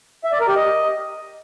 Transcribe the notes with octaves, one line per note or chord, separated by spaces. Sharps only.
E5
D5
A#4
G4
D#5